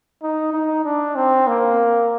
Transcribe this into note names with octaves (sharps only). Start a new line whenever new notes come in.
D#4
D#4
D4
C4
A#3